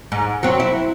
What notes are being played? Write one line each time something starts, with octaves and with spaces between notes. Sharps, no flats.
G#2
F#3 C4
E4